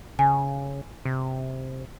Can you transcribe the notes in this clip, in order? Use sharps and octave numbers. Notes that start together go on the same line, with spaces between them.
C#3 G#5
C3